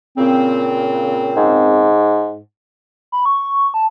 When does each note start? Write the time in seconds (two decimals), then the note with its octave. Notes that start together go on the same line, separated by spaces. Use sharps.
0.16 A#2 C#3 C4
1.36 G#2
3.12 B5
3.26 C#6
3.74 A5